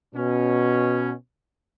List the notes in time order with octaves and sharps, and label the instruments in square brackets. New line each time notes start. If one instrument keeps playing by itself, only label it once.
[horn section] B2 C#4